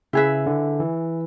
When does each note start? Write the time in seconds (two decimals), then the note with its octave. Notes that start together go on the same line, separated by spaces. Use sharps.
0.13 C#3 E4 G#4 B4 E5
0.46 D3
0.80 E3